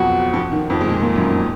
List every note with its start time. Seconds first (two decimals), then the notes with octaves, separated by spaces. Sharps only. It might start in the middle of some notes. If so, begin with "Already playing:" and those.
Already playing: F2 B2 F3 F#3 B3 F#4
0.33 F2 F3
0.52 D#3
0.70 F2 F3
0.81 G#3
0.88 A#2 A#3
1.02 A#2 A#3
1.16 F#2 F#3
1.30 D#3